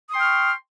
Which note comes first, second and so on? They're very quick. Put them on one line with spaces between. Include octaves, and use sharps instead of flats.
D#6 C6 G5 F6 C#6